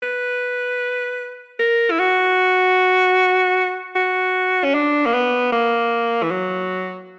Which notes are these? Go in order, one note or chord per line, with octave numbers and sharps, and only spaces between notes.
B4
A#4
E4
F#4
F#4
C#4
D4
A#3
B3
A#3
E3
F#3